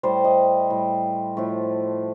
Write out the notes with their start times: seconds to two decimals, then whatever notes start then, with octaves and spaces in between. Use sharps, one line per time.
0.03 A2 G3 C5
0.25 D#5
0.70 A2 G3
1.37 A2 F3 A3